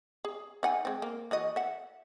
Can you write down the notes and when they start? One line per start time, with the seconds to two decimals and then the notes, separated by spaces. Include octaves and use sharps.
0.25 G#4
0.63 D#4 F#5 G#5
0.85 G#3 C4
1.02 A#3
1.31 E3 F#4 D#5
1.56 E5 F#5